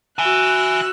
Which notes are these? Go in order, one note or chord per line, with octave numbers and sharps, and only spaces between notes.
F#4 E5 G#5 E6 F#6